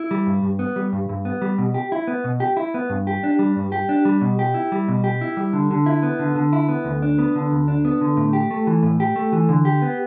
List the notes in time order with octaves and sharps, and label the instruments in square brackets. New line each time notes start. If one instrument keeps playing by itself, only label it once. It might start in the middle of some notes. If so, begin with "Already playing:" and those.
Already playing: [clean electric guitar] E4
G3
G2
G2
B3
G3
G2
G2
B3
G3
B2
G4
E4
B3
B2
G4
E4
B3
G2
G4
D4
G3
G2
G4
D4
G3
B2
G4
E4
G3
B2
G4
E4
G3
D3
D3
E4
B3
D3
D3
E4
B3
D2
D4
B3
D3
D2
D4
B3
D3
A2
G4
A3
E3
A2
G4
A3
E3
D3
G4
B3